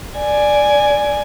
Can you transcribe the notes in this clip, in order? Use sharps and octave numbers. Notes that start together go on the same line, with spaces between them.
D5 G#5